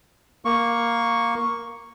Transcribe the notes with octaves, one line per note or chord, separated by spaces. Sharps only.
A#3 C#6